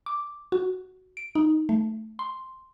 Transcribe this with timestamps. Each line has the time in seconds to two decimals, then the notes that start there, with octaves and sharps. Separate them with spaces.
0.06 D6
0.52 F#4
1.17 D7
1.35 D#4
1.69 A3
2.19 C6